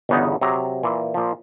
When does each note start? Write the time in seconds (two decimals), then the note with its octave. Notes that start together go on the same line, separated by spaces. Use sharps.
0.09 G1 E2 C#3 B3 D#4
0.41 C3 F#3 G#4 A#5
0.83 A#2 E3
1.14 A#2 F3